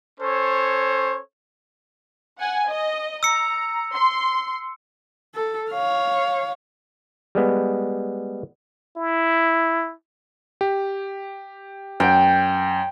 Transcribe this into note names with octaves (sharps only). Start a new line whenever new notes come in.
C#4 A4 C5 C#5
F#5 G#5
D#5
A#5 E6 C#7
C6
A4
C#5 F5
G3 G#3 B3
E4
G4
F#2 G5